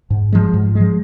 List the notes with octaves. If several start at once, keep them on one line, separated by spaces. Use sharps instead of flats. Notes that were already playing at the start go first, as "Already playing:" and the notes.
G#2
F3 G#3
G#2
F3 G#3